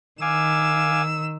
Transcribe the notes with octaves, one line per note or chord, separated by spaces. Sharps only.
D#3 F5 G#5 D6 E6